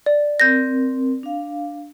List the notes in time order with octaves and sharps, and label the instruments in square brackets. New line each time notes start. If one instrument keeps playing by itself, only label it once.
[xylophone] D5
[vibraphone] C4 A#4 [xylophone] G6 A#6
[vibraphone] D4 F5